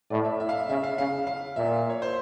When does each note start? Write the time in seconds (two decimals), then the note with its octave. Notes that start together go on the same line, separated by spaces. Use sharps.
0.10 A2 D5
0.25 E5
0.40 E5
0.49 F5
0.59 E5
0.69 C#3 E5
0.84 F5
0.98 C#3 F5
1.27 F5
1.56 A#2 E5
1.90 C#5
2.02 C5